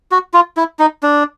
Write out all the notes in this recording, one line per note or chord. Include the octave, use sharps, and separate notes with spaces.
F#4
F4
E4
D#4
D4